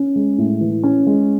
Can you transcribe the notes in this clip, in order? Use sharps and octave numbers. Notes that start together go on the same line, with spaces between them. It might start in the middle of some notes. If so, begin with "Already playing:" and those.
Already playing: C#4
G#3
A2
E3
C#4
G#3